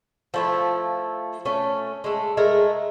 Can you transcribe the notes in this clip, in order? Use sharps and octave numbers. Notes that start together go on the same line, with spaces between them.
F3 A3 E4
A3 C#4
G#3 A3
G#3 A3 A#4